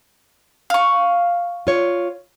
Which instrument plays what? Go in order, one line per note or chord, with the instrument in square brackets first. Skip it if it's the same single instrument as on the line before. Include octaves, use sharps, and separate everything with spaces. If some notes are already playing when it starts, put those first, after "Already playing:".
[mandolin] F5 C#6
[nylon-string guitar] F4 C#5